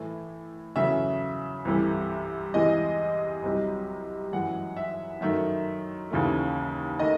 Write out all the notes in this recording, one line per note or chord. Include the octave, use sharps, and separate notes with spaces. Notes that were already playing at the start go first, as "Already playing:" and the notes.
Already playing: A2 E3 A3
E2 C#3 F#3 A3 E5
C2 C3 E3 A3
E2 C3 E3 G#3 D#5
C2 C3 F#3
F#2 E3 G#3 F#5
E5
F#2 D#3 A3 E5
D#2 C#3 E3 A3
D#3 A3 D#5